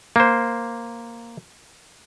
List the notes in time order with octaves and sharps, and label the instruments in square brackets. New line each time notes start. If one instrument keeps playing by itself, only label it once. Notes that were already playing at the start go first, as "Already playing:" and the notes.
[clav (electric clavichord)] A#3 C5